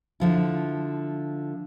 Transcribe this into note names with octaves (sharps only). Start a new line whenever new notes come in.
D3 F3 E4